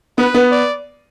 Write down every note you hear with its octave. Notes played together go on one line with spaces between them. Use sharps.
B3 B4
B3
D5